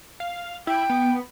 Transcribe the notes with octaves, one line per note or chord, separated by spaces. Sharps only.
F5
E4 G5
B3